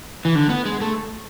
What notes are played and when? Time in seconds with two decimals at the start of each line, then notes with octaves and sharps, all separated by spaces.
0.25 E3
0.35 D3
0.50 B3
0.66 G#3
0.81 A3